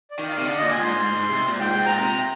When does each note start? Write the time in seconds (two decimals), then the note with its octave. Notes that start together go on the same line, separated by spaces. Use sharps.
0.11 D5
0.19 D#3
0.28 F5
0.39 C3
0.45 D3 D5
0.57 A#2 D#5
0.71 G#5
0.80 G#2 C6
0.96 G#2
1.13 G#2
1.30 C3
1.48 A#2
1.60 G#2 G5
1.72 G#2 G5
1.86 A#2 A#5
1.99 C3 A#5